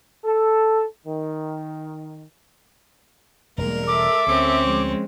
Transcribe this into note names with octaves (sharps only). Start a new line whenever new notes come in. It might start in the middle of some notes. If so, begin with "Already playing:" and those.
A4
D#3
E1 G#2 G3 A#3 A#4
A4 E5 D6
D2 C4 C#4
F3 G#3